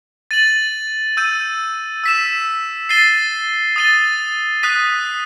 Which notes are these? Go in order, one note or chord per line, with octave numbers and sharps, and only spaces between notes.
A6 D#7 F#7
E6 G6 D#7
E6 B6 E7
A6 C7 D#7 G7
D#6 A6 D#7 G7
D#6 F#6 B6 D#7